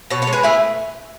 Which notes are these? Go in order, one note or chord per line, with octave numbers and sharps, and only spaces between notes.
B2 A4 C#5
A4 C#5
G#3
G#4 B4
A3 E4 G#4